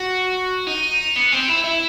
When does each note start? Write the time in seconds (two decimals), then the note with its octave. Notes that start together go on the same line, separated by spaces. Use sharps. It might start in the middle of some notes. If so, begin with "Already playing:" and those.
Already playing: F#4
0.67 D#4
1.16 B3
1.32 C4
1.48 E4
1.64 E4